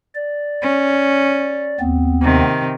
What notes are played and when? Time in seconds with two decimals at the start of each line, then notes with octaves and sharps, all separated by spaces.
0.15 D5
0.62 C#4
1.80 D#2 B3 C4
2.21 C3 D#3